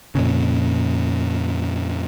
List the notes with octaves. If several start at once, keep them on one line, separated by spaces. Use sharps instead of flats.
F2 A#2 C#3